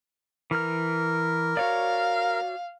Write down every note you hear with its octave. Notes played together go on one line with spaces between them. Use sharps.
E3 A#4 F6
F#4 C#5 D5 F5